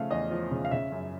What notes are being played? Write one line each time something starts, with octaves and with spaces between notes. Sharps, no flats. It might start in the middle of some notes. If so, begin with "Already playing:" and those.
Already playing: C#3 F3 A3 F5
E2 D#5
F3
C#3
F5
C#3 E5
F#2